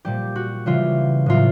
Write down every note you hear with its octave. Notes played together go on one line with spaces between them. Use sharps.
A#2 G3 G4
F#4
C#3 E3 G3 F4
A2 F#3 F4